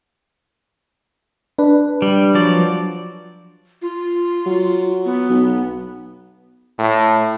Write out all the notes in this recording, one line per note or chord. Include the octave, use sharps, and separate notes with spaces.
D4 B4
G3
F3 F#3 D5
F4
F#3
B3
B1
A2